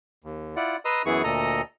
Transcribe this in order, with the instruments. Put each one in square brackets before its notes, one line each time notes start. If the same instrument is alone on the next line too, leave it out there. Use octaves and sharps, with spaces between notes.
[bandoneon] D#2
E4 F4 D5 F#5
B4 D#5 A#5 C6 D#6 E6
F#2 E3 B3 E4 G#4 C#6
D2 A#2 A4 D#5 A#5